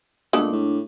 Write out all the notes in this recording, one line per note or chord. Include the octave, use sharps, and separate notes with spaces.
A#2 G#3 A3 B3 D4
A2